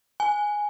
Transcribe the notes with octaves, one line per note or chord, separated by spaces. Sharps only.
G#5